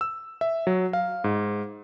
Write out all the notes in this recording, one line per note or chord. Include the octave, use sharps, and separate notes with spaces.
E6
E5
F#3
F5
G#2